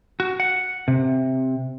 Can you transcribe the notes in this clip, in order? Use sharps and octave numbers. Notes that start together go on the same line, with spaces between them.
F#4
F#5
C3